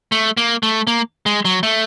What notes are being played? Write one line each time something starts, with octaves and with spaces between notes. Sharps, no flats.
A3
A#3
A3
A#3
G#3
F#3
A3